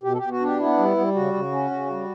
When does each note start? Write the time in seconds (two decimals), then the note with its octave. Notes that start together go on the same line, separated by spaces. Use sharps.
0.03 B2 G4
0.13 A4
0.17 B2 G4
0.31 F#4
0.40 D4
0.46 G4
0.59 B3 E4
0.78 G3
0.97 G3
1.14 C#3 F#4
1.33 C#3
1.52 C#4
1.71 C#3
1.89 G3